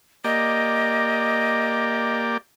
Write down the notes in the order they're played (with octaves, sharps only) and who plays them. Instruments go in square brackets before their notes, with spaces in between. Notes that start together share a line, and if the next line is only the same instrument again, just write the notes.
[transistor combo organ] A#3 G4 D5 [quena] D#5